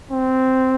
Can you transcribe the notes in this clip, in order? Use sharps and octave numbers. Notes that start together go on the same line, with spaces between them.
C4